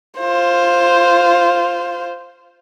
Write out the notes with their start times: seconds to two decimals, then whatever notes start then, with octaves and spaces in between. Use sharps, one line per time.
0.19 F4 C5